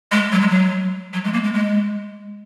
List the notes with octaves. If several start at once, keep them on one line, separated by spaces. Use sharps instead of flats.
G#3
F#3
G#3
F#3
F#3
G#3
A#3
G#3
G#3